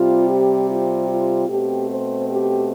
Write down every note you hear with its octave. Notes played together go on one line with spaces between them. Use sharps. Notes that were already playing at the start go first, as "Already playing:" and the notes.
Already playing: C3 G3 C4 F4
G4
F4
F4
B2 A3 C4 G4
C5
G4